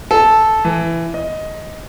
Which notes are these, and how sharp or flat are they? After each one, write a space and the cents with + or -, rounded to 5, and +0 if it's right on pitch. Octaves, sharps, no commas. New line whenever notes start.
A4 -10
E3 +15
D#5 +10